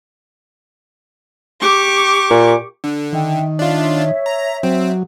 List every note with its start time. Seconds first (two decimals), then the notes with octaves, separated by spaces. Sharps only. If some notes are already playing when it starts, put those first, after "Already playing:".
1.61 G4 C#6 D6
2.30 A#2
2.84 D3
3.13 D#3 E5 G5
3.59 D4 F4 C#5 E5
4.26 A#5
4.63 F#3 C4